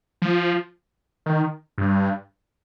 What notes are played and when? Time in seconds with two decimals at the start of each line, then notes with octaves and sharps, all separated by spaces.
0.22 F3
1.26 D#3
1.78 G2